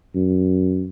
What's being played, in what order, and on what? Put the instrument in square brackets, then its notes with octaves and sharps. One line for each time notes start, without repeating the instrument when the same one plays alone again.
[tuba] F#2